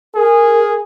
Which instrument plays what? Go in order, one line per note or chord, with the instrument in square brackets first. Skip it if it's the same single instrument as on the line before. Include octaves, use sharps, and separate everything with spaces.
[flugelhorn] G#4 [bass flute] A#4